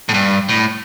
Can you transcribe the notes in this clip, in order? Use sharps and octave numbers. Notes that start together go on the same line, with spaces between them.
A2
G2
A2